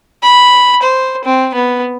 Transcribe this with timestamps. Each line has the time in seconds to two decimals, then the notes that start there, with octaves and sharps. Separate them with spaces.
0.23 B5
0.83 C5
1.25 C4
1.54 B3